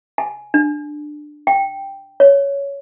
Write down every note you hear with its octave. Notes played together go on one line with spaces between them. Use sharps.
G#5
D4
G5
C#5